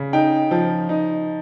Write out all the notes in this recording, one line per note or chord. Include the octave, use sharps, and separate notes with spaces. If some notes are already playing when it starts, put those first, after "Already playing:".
Already playing: C#3
D#4 G5
F3
D#4